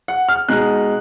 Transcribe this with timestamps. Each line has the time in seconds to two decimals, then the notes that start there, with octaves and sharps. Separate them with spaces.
0.08 F#5
0.29 F6
0.48 B2 G#3 D#4 F#6